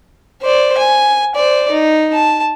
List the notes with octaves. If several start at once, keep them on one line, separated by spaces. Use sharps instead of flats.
C5 D5
G#5
C5 D5
D#4
A5